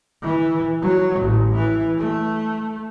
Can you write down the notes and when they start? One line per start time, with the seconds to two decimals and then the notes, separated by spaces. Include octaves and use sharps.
0.22 E3
0.82 F#3
1.20 A1
1.55 E3
1.98 A3